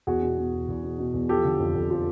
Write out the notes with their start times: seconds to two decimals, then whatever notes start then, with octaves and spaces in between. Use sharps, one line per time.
0.07 E2 F#4 G#4
0.22 B2
0.38 B2
0.53 E2
0.68 E2
0.83 B2
0.99 B2
1.14 E2
1.29 F3 G4 A4
1.45 D3
1.60 F2
1.75 F2
1.90 F3